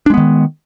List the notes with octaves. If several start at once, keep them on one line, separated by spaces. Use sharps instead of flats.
D#3 G#3 B3 D4